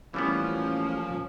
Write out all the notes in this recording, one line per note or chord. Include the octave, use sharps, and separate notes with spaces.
A1 E3 F3 G3 A#3 B3 C#4